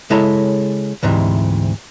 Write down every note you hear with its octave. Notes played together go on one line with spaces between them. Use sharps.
C#3 G#3 E4 A4 C#5 A#5
D2 G#2 C3 E3